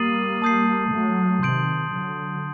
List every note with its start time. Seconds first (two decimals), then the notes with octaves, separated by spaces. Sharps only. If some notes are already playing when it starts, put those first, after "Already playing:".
Already playing: G3 A#3 D#6 A6 C7 D#7 F#7
0.42 A5 D#6 G6 C7
0.92 F#3 A3
1.42 C3 D#3 C6 G6 D7 F#7
1.93 D3 F#3